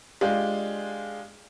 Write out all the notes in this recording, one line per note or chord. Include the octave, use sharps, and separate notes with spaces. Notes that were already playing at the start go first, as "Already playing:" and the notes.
G#3 D4 F4 G4